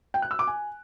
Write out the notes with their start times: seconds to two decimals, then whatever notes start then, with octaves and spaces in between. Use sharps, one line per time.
0.14 G5
0.22 F#6
0.31 E6
0.39 D6
0.47 G#5